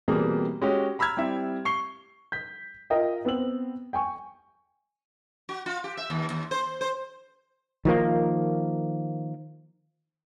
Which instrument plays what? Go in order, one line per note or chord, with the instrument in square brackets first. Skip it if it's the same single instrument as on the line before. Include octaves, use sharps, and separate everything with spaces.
[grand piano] B2 E3 G3 A#3 C4 G#4
G#3 C#4 F#4 G4 C#5
A#5 B5 E6 F6 G#6
G3 C4 E4 E5
C#6 C7 G7
G6 B6
F4 A#4 D#5 E5 G5
B3 C4 E6 F#7
G5 G#5 C#6
[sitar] F#4
F4
G4
E5
D#2
D#2
C5
C5
[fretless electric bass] D#3 F3 A#3